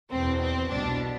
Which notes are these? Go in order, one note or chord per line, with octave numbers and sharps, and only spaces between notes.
E2 B2 C4
C4
C2 B2 D4